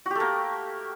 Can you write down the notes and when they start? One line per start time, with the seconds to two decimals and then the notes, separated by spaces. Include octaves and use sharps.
0.06 F#4
0.10 G4
0.15 A3
0.20 A#3